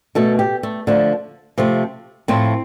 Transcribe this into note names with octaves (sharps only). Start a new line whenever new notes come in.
B2 A3 A4
G4
A3
D3 F3 A3
C3 F3 A3
A2 F3 A3 C4